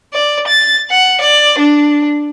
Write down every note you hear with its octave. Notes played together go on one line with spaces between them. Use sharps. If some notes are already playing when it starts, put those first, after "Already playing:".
D5
A6
F#5
D5
D4